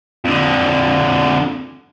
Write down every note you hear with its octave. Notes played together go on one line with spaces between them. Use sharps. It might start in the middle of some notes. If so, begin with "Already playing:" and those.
F2 D3